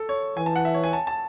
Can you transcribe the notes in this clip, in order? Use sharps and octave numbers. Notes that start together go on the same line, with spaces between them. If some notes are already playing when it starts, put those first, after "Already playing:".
Already playing: A4
C#5
E3 G#5
A5
F#5
E5
C#5
G#5
A5
A5